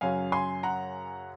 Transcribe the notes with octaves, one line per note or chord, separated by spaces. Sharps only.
F#2 C#3 F#3 C#4 F5 G#5
G#5 C6
F#5 A#5